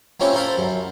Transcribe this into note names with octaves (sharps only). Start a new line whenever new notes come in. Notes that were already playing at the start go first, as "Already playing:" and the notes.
A#3 C4 C#4 E4 F4 C#5
A4 A#4 C5 F5 A5 B5
F#2